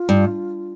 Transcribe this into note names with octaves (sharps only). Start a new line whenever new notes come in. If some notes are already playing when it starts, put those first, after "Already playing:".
Already playing: F4
G2